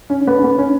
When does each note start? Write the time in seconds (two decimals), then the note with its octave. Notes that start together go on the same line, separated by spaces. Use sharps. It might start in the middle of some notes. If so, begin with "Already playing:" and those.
0.10 C#4
0.27 B3
0.39 C#4
0.44 B3
0.58 C#4